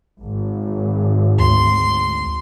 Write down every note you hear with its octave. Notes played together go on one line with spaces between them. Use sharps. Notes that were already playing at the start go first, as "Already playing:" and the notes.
G#1
D2 C6